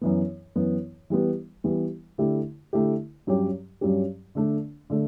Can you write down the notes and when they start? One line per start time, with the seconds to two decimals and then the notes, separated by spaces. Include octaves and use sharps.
0.01 F#2 E3 B3
0.56 F#2 E3 B3
1.10 E3 G3 B3
1.64 E3 G3 B3
2.18 D3 A3 E4 G4
2.73 D3 A3 E4 G4
3.27 G2 F#3 C#4 G4
3.81 G2 F#3 C#4 G4
4.35 D3 A3 D4
4.90 D3 A3